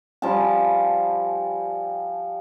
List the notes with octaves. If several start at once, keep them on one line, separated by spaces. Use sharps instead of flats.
F3 G3 G#5 A5